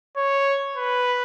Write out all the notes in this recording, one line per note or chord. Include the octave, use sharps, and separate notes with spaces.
C#5
B4